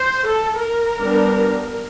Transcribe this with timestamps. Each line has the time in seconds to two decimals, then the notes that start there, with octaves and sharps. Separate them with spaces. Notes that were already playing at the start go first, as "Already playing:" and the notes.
Already playing: C5
0.26 A4
0.62 A#4
0.98 G3 B3 D4